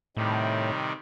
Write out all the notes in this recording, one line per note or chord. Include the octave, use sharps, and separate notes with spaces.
A2 C3 D#3 G3